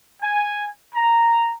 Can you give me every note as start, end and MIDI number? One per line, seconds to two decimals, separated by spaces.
0.22 0.67 80
0.94 1.53 82